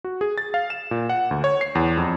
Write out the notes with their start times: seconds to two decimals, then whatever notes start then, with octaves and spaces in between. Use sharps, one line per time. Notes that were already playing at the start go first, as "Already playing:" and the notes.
0.04 F#4
0.21 G#4
0.38 A6
0.54 F5
0.70 E7
0.91 A#2
1.09 F#5
1.31 D2
1.44 C#5
1.61 C7
1.75 E2
1.97 F2